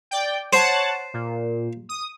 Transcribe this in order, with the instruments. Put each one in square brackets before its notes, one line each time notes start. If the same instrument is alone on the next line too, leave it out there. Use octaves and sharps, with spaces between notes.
[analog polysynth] D5 G5
[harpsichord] C5 [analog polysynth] C#5 F#5 A5
[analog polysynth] A#2
D#6